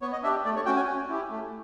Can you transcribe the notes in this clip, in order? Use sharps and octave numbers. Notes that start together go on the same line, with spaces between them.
B3 C#5
D#5
D4 G4 E5
A3 D5
C#5
C#4 F#4 G5
G#5
C#4
E4 G4
A3